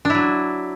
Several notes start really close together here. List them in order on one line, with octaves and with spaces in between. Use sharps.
D4 E4 F#3